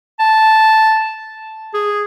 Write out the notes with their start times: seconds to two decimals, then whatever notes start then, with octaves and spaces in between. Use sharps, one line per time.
0.20 A5
1.74 G#4